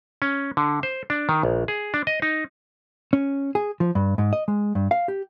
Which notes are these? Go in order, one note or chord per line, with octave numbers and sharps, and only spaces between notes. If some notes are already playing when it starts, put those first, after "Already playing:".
C#4
D3
C5
D4
D#3
A#1
G#4
D4
D#5
D#4
C#4
G#4
F3
G2
G#2
D#5
G#3
G2
F5
G4